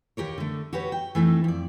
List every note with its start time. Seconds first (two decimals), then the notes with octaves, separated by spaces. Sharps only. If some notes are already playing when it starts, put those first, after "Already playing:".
0.17 D#2 G4 A#4 C#5
0.38 D3 A3
0.73 F#4 G4 B4 C#5
0.92 G5
1.15 E3 A3 C4 D#4
1.44 F2 D5